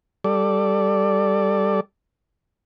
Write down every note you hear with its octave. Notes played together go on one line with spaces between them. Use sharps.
G3 A4 D5